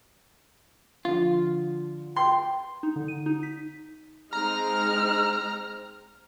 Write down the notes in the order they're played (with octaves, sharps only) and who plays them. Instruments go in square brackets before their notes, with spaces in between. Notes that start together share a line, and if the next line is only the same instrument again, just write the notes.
[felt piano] D3 F3 [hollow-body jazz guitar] F4
[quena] G5 [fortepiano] C6
[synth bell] D#4
D3
D#7
D#4
B6
[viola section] G#3 C4 D#4 [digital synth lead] A#5 [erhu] F6